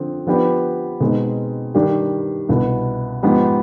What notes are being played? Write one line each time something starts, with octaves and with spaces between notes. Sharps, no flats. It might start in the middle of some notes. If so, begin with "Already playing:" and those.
Already playing: D3 F3 C4 F4
F3 B3 D4 G4 B4
B2 G#3 C4 D#4
G2 D#3 G3 D4 G4
C2 B2 B3
G#2 F3 B3 D#4 G4